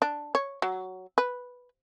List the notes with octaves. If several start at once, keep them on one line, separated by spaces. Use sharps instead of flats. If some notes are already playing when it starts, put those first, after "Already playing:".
D4
C#5
F#3
B4